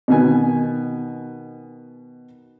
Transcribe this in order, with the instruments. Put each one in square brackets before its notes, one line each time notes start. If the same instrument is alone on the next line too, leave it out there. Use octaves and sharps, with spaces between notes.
[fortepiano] B2 D#3 B3 G#5